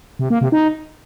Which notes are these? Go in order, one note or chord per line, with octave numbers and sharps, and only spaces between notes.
C3
A#3
C3
D#4